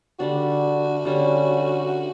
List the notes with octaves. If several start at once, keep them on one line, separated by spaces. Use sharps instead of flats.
D3 G3 D4 F#4
D3 G3 C#4